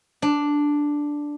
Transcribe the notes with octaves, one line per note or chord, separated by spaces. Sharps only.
D4